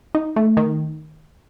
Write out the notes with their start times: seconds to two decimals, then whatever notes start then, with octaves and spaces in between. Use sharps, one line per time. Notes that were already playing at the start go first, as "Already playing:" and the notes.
0.15 D#4
0.36 A3
0.57 D#3